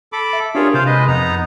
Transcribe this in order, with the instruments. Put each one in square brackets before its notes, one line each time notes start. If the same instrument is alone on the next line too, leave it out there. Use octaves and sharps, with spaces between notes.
[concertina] A4 B5 D6
[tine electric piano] E5
[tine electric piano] D4 G4 A#4 [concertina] F4 G#4 C#5
[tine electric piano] C3 G6 [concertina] F4 C5 F5
[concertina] G#3 B4 D#5
[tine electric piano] F2 [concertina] B3 D#4 A#5